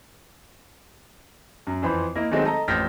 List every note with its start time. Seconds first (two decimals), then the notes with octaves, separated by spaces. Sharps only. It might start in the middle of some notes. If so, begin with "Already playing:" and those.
1.67 F#2
1.82 F2 E3 C5 B5
2.15 A#3 E4 D#5
2.31 D#3 F#3 G#3 A3 C4 D#4
2.45 A4 D#5 A#5
2.68 A1 F2 F6 G6 A#6 B6